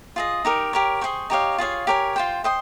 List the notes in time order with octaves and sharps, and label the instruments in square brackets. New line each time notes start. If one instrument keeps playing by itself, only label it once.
[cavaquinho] F4 G#4 D#5
D#4 G4 A#4
G4 A#4 C#5
G#4 C5 G5 C#6
D#4 G4 C#5 F5
F4 G#4 C#5 F5
G4 A#4 C#5 G#5
F4 C5 G5
C5 D#5 G5 C6